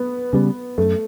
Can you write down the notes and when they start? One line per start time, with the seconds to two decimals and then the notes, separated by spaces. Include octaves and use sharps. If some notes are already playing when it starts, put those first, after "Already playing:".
Already playing: B3
0.33 C#3 G3 B3
0.78 F#2 A3